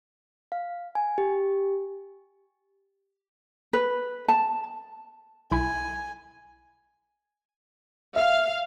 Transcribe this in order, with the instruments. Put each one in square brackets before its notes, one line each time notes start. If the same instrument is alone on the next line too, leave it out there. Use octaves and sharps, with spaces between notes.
[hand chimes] F5
G#5
G4
[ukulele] B4
A5
[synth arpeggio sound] B1 E4 B5 [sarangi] G#5
[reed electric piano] E5 [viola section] F5